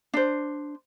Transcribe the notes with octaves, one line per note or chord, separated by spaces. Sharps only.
D4 C5